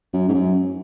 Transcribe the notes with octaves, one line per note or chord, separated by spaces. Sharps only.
F#2
G#2
F#2